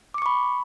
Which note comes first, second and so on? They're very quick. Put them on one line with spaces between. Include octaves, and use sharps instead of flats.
D6 C#7 C#6 B5